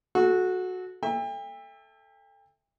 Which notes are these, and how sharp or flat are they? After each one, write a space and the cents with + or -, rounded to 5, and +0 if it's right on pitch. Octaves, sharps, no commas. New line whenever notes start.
F#4 -10 A4 -30
A4 +0 E5 -5 G5 +40